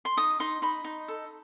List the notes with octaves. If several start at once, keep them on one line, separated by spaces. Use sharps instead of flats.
C6
D#4 D#6
D#4 C6
D#4 B5
D#4
A4